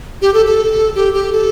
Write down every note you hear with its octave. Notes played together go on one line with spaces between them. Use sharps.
G4
A4
A4
G4
G4
A4